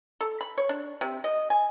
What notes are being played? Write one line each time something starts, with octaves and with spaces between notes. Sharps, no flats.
A4
B5
C#5
D4
C3
D#5
G#5